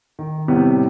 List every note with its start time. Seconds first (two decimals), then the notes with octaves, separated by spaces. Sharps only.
0.19 D#3
0.48 A2 C3 G3 B3